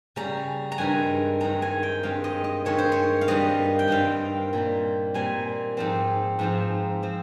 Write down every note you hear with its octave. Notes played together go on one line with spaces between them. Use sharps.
C#3 G3 C#4 A#5
A#5
G2 D#3 G#3 C4 G#5
G2 D#3 G#3 C4 A#5
G#5
G5
G2 D#3 G#3 C4 F5
D#5
D#5
G2 D#3 G#3 C4 C#5
C5
C#5
F5
G2 D#3 G3 C4 D#5
G5
G2 D#3 G3 C4 F5
A#2 G3 C4
A#2 G3 C4 G#5
G#2 F3 C4
G#2 F3 C4
F3 C4